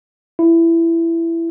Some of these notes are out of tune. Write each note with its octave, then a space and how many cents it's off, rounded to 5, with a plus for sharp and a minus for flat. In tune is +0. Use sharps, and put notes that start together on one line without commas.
E4 +15